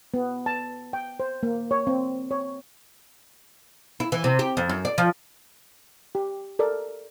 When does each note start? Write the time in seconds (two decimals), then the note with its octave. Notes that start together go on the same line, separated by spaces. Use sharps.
0.14 B3
0.46 A5
0.93 G5
1.20 C5
1.43 A#3
1.71 C#5
1.87 C4
2.31 C#5
4.00 E4
4.12 E3
4.24 C3
4.39 G4
4.57 F2
4.69 F#2
4.85 D5
4.98 F3
6.15 G4
6.59 A4 A#4 D5